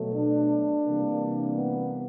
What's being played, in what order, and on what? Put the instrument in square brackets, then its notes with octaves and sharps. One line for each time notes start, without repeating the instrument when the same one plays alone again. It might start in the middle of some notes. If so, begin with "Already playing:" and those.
Already playing: [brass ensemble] B2 F#3 A3
D4
C3 E3 G3 A#3
B3